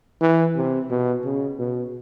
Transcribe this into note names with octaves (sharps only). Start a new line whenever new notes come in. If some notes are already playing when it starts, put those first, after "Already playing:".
E3
C3
B2
C#3
B2